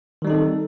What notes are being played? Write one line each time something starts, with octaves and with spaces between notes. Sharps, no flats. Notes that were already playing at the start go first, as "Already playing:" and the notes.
D#3 G3 C4 D#4 A4